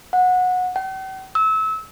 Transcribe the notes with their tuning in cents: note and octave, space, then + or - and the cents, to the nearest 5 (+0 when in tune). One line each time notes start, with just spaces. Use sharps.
F#5 -20
G5 -45
E6 -25